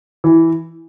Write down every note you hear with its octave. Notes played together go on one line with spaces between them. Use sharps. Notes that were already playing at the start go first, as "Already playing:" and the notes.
E3